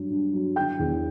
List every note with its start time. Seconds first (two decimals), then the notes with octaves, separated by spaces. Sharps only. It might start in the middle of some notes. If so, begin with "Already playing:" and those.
Already playing: G2 F#3
0.10 G2
0.33 F#3
0.56 D3 G5 G6
0.79 E2